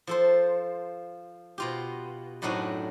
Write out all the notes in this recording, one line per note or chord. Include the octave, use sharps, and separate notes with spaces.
F3 A4 C5
B2 F4 G4
F#2 A2 F#3 D4 D#4 F#4